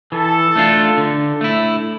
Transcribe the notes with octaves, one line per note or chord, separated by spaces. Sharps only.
E3 A4
A3 D4 F4
D3
A3 E4